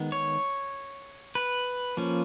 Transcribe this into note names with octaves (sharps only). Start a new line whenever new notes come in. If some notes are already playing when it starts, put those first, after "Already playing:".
Already playing: D#3 G#3 B3
C#5
B4
F3 A#3 C#4